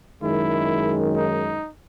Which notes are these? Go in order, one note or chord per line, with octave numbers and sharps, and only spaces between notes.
F#2 D#3 G#3 E4
D#4